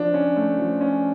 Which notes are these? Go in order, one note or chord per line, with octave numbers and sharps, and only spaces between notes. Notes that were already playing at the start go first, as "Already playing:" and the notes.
Already playing: F3 D4
C#4
A3
F3
C#4